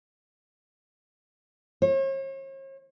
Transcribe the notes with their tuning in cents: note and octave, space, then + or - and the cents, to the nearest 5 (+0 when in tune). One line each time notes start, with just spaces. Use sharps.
C#5 -45